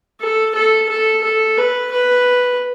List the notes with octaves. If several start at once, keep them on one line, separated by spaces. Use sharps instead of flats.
A4
A4
A4
A4
B4
B4